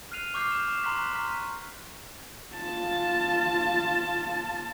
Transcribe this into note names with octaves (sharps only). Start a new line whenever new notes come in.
F6 F#6 C7 D#7 F7
C#6 D6 F6 G6 C7
E7
A#5 C6 C#6 F#6 B6
A#5 C6 F#6
F6 B6
F4 A5